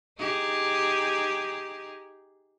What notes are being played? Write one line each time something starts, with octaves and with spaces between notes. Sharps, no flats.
D#4 G4 G#4